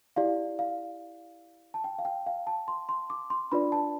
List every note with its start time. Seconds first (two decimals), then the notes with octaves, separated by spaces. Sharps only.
0.16 E4 G4 D5 F5
0.59 F5
1.74 A5
1.84 G5
1.99 F5
2.05 G5
2.27 F5
2.47 A5
2.68 C6
2.89 C6
3.10 D6
3.30 C6
3.52 D4 F4 B4 D5 B5
3.72 A5